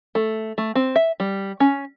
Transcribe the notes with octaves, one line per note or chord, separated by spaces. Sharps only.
A3
A3
C4
E5
G3
C#4